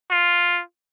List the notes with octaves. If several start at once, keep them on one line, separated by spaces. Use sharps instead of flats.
F4